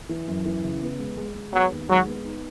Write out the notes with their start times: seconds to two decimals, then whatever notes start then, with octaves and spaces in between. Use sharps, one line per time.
0.09 E3
0.28 F#2
0.45 E3
0.63 C#3
0.82 B3
0.99 G#3
1.17 G#3
1.35 G#3
1.53 F#3 B3
1.71 D#2
1.89 F#3 G#3
2.07 B3
2.25 D#4